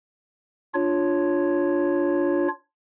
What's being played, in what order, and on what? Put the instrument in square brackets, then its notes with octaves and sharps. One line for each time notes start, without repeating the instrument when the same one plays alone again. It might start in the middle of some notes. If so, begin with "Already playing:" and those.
[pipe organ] D4 F4 C#5